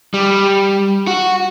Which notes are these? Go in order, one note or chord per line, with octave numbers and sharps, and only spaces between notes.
G3
F#4